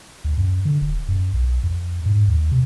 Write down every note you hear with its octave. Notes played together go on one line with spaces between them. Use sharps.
D2
F#2
D3
D#1
F#2
B1
F2
G#2
D#2
C3